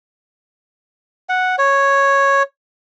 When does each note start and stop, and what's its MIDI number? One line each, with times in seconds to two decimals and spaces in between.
1.29 1.56 78
1.59 2.43 73